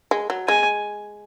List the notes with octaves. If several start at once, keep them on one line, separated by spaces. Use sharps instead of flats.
G#3
F#3
G#3 G#5